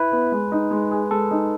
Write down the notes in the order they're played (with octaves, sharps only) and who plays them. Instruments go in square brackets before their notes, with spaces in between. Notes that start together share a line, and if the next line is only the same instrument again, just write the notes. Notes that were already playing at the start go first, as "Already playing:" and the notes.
Already playing: [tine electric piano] E4 B4
[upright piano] B3
G#3
D#4
G#3
G#4
[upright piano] G#3 [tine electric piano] A4
[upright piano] D#4